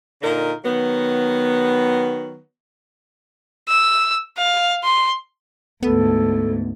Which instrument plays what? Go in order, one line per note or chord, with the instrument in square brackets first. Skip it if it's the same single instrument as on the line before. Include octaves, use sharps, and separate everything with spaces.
[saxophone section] A#2 D3 D#4 A#4
D#3 F#3 B3
[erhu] E6
F5
C6
[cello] D2 G#2 [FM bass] B3 [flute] A4